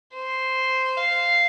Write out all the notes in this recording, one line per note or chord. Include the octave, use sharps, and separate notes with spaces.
C5
F5